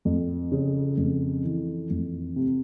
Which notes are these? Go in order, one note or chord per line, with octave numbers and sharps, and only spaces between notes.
F2
C#3
F2
E3
F2
C3